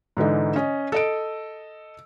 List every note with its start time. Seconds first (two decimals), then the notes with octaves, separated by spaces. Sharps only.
0.17 G#2 D3 E3 D#4
0.56 C#4 D#5
0.92 A4 D#5 D7